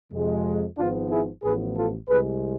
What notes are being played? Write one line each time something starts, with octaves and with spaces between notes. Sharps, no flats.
F2 C3 G#3
G#1 G#2 F3 B3 D4 F4
E4 G#4
A1 A2 F3 B3 G#4 B4
F4 A4
C2 C3 G#3 G#4 B4